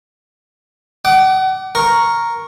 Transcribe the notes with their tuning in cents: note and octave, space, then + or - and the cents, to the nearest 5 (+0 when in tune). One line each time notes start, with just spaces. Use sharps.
F#5 +35 D6 +0
A#4 +0 C#6 +0